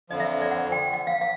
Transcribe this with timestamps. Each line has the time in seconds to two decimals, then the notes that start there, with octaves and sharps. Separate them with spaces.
0.10 F2 D3 F3 D#5
0.20 E5
0.31 E5
0.42 D5
0.51 F#5
0.72 G5
0.93 F#5
1.07 F5
1.21 F5